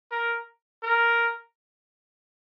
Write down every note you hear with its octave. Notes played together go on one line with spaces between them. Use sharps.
A#4
A#4